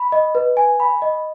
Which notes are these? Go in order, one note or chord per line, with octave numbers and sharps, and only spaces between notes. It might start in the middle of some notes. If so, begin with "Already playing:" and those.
Already playing: B5
D#5
B4
G#5
B5
D#5